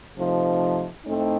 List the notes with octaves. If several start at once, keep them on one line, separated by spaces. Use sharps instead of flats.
C3 F3 A3 D#4
A2 A3 C4 D#4